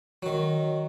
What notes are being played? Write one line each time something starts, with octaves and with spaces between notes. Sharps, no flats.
D#3 F#3